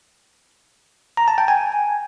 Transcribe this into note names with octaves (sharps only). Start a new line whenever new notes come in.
A#5
A5
G5
G#5